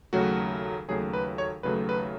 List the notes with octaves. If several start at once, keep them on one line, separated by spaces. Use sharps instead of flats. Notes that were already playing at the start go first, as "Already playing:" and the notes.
D#2 C#3 F#3 A3 F#4
D#2 C#3 F#3 A3 G#4
B4
C#5
D#2 C#3 F#3 A3 B4
B4